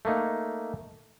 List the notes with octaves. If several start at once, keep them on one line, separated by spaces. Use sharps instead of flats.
A3 A#3 D#4